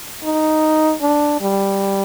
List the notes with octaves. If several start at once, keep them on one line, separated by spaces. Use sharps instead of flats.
D#4
D4
G3